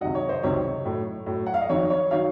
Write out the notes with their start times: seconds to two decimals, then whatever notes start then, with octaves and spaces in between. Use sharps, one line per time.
0.01 C#2 C3 D#3 F#3 D#5 F#5
0.15 C#5
0.29 C5 D#5
0.43 C#2 C3 D#3 F#3 C#5
0.85 A2 F#3
1.26 A2 F#3
1.46 F#5
1.54 F5
1.61 D#5
1.69 F2 D#3 F#3 C#5
1.90 C#5
2.11 D#3 F#3 C#5 F5